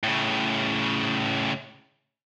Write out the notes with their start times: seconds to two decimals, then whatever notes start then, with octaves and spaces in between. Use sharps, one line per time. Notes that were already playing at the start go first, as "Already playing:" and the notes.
0.03 A2 C#3